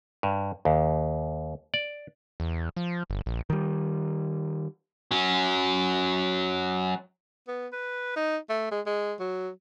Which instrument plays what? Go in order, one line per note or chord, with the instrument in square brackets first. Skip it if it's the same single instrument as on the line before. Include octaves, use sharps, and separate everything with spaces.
[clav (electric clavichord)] G2
D#2
D5
[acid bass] E2
F3
G1
A#1
[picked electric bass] D#3 G3
[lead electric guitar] F#3 C#4
[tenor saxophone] B3
B4
D#4
A3
G#3
G#3
F#3